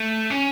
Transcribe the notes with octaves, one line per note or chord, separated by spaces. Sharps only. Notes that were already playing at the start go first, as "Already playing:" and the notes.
Already playing: A3
C#4